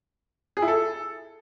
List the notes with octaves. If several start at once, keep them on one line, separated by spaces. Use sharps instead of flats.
G#4
E4
A4